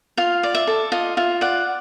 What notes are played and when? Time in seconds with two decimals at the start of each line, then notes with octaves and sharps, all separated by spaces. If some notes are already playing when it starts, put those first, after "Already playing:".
0.17 F4 F5
0.43 D5
0.54 E5
0.67 A4
0.92 F4 D#5
1.17 F4 E5
1.41 D5 F#5